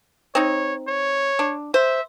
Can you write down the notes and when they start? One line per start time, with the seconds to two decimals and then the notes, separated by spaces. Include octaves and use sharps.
0.35 C4 D#4 C#5
0.88 C#5
1.39 D4
1.74 C5 E5